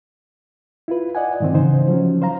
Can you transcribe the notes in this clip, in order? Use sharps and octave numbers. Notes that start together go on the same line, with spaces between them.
E4 F4 B4
D5 D#5 F#5 G#5
G#2 D#3 C4
C#3 E3 D#4 C5
F3 F#3 C#4 D#4
C5 F5 A#5